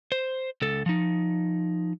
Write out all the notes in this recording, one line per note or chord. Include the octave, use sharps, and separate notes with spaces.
C5
C#2 A4
F3 D#4